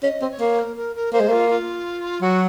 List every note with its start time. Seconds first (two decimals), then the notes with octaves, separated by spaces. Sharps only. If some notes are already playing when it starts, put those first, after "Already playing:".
0.03 C#4 D#5
0.21 C4
0.30 C#5
0.40 A#3
0.59 A#4
0.76 A#4
0.95 A#4
1.12 A#3 C5
1.20 G#3
1.28 A#3 F4
1.49 F4
2.21 F#3 F#4